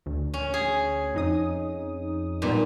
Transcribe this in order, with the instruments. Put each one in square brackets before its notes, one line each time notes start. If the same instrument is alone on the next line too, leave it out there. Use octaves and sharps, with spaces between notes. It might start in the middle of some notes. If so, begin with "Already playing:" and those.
[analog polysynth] D2
[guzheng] C#4
G#4
[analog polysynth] F2 D#4 D#6
[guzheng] A#2 [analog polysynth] G3 B3 D#4